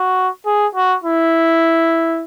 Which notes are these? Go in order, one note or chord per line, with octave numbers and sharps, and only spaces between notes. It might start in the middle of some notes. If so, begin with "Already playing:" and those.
Already playing: F#4
G#4
F#4
E4